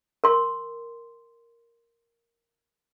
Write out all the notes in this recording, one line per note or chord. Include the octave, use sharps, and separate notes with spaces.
A#4 C6